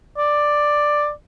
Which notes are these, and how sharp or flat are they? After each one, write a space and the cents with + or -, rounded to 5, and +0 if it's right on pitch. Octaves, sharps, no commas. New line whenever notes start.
D5 +10